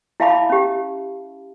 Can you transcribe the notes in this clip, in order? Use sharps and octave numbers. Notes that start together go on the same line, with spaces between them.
E4 E5 F5 A5 B5 D6
C#4 G4